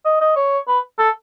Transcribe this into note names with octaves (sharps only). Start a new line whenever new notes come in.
D#5
D#5
C#5
B4
A4